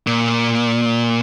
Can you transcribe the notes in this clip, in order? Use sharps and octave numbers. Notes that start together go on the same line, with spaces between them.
A#2